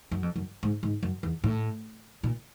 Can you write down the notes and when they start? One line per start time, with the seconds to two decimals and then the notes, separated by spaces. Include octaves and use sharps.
0.11 F#2
0.23 F2
0.36 F#2
0.63 G#2
0.83 G#2
1.03 F#2
1.23 E2
1.44 A2
2.23 A#2